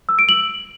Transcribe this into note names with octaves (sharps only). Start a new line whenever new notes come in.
E6
D7
F#7